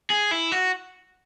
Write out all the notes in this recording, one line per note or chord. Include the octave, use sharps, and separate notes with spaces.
G#4
E4
F#4